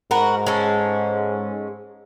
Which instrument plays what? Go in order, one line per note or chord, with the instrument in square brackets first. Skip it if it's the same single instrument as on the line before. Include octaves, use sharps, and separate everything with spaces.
[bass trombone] G#2 [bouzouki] F#4 A#4 B4
[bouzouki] G#3 C#4 A4